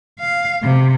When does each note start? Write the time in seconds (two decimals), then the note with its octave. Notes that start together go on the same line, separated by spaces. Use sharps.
0.20 F5
0.63 C3